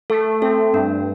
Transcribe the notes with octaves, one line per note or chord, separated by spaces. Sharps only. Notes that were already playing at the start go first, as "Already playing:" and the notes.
A3 A4
C4 A4
G2 D4